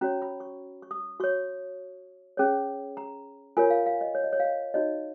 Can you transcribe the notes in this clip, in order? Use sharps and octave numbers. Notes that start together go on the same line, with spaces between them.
C#4 F#4 C#5 A#5
B5
C#6
C#6
D#6
F#4 C#5 C#6
C#4 G#4 C#5
A#5
F4 A#4 C#5 G#5
F5
F5
D#5
C#5
D#5
C#5
F5
D#5
D#4 F#4 C#5 D#5